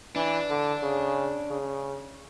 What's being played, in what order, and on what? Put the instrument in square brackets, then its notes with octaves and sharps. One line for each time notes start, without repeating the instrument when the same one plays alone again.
[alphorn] E3 [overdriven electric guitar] D4
[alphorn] D3
C#3
C#3